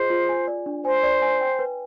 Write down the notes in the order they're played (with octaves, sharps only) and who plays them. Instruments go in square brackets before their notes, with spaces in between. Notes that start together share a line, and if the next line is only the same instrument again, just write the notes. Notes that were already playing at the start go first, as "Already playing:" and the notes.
Already playing: [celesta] F4 G#4 D#5 [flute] C5
[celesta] F4
G#5
D5
D4
[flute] C5 [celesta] G#5
[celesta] D5
G#5
G5
B4